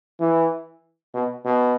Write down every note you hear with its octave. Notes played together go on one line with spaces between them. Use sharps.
E3
B2
B2